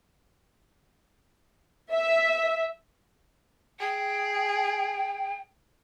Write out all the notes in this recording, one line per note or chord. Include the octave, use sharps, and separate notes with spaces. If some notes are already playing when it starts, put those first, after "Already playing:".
E5
G#4 G5